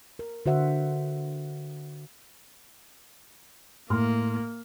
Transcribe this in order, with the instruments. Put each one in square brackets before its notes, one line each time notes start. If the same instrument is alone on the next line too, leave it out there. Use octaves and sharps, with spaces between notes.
[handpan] A#4
D3 F#4 C5 E5 F#5
[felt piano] A2 C6 F6 [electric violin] A#3